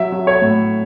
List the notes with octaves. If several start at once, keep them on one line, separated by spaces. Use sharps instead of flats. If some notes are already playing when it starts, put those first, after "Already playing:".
Already playing: F#3 E5
F#3
C#5
A2